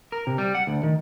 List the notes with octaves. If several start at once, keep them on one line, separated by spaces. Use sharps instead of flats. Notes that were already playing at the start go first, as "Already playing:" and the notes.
A#4
C3
G3
F#5
D2
D#3